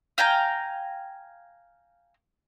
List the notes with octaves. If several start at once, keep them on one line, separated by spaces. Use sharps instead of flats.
F5 G5 G#5 A#5